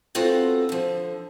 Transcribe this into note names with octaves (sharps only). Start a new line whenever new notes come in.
B3 C4 F4 F#4 A4
D3 F3